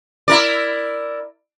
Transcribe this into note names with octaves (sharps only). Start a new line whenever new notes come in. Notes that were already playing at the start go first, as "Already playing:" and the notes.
E4 A#4 D5